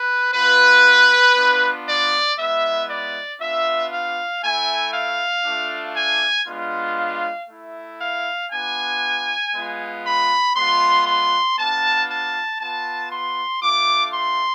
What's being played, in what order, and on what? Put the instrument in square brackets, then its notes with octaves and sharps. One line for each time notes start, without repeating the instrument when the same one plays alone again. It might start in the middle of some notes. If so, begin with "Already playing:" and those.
Already playing: [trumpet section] B4
B3 F4 B4
B3 D4 F4
D5
G#3 B3 E4 E5
D5
B3 D4 F4 E5
F5
A3 E4 G#5
F5
A3 D4 F4
G#5
G#3 B3 D4 F4
F5
A3 E4
F5
B3 D4 F4 G#5
G#3 B3 F4
B5
G#3 B3 F4 C6
C6
B3 D4 F4 A5
A5
B3 F4 A5
C6
A3 D4 F4 D6
C6